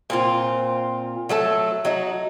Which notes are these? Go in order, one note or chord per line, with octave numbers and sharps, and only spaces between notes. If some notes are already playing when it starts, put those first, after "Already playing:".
A#2 C4 F4
F#3 A3 A4 A5
F#3 D#4 F#4